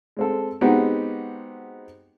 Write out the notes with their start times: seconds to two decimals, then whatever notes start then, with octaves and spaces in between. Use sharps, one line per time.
0.17 G#3 C4 A4
0.61 G#3 B3 C4 D#4 F#4 G4